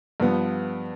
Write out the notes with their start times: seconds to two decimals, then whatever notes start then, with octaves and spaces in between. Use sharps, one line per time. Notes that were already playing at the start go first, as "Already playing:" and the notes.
0.20 G2 F3 B3